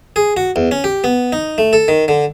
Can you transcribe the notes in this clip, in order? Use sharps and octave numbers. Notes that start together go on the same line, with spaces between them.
G#4
F#4
E2
C#4
G4
B3
D#4
A3
A4
D#3
D3